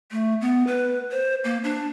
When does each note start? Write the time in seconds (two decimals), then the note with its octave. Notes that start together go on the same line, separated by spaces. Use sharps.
0.11 A3
0.41 B3
0.67 B4
1.11 C5
1.44 A#3
1.64 D4